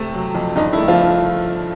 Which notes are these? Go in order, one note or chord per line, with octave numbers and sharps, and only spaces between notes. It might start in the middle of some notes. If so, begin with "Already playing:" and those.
Already playing: C3 A3
F#3
F2
G2 D#4
E4
A3
F3 F4